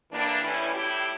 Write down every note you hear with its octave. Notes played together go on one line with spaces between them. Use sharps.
A2 E3 G3 A#3 D4
A2 E3 G3 C#4 E4
A2 G3 E4 G4